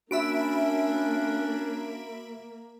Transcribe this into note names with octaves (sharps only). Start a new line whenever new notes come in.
A#3 C#4 D4 F#4 E5 B5 D7